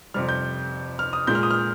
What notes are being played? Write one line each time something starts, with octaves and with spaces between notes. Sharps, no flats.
F2 C3 G3 F6
G6
F6
D#6
A#2 G#3 G6
F6
D#6
F6